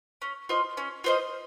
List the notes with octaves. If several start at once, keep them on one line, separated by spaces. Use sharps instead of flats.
C#4
F4 C5 D#5
C#4
F4 C5 D#5